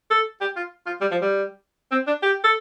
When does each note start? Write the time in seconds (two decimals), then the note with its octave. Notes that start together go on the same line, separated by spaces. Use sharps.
0.11 A4
0.41 G4
0.56 F4
0.86 F4
1.01 G3
1.11 F3
1.21 G3
1.92 C4
2.07 D4
2.22 G4
2.44 A4